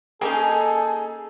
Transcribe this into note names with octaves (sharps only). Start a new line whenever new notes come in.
A#3 C#4 D#4 G#4 A4